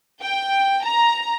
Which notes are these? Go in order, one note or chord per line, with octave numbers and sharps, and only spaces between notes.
G5
A#5